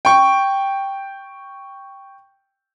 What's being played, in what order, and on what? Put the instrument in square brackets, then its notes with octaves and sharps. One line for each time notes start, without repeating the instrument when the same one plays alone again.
[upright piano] G5 C#6